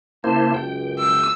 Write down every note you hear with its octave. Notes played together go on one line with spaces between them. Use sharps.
C#3 A#3 E4 C5 A5
C#2 F#2 G5
E6